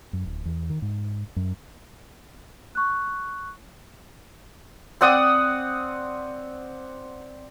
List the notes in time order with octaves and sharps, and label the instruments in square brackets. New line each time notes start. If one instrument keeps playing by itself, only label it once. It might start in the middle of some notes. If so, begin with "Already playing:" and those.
[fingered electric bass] F#2
D1
E2
D#3
G#2
F#2
[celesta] C#6 F#6
[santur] C4 D5 F#5 D#6